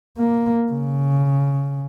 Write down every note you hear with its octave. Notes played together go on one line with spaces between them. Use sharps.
A#3
C#3